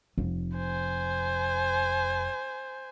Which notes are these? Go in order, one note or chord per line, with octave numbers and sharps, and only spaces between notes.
F1
C5 G#5